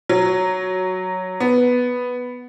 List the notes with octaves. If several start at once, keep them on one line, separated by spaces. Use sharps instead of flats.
F#3
B3